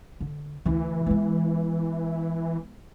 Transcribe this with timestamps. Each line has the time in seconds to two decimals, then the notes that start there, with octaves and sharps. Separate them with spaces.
0.21 D3
0.66 D2 E3 E4
1.06 G#3 B3